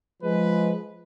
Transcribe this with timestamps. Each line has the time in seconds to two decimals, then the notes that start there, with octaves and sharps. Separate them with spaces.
0.23 F3 G#3 B4